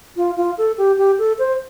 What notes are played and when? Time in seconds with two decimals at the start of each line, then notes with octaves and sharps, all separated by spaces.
0.17 F4
0.37 F4
0.58 A4
0.78 G4
0.98 G4
1.19 A4
1.39 C5